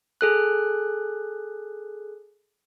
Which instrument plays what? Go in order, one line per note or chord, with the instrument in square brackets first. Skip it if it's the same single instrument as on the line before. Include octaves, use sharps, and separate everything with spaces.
[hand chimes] G#4 A4 F#6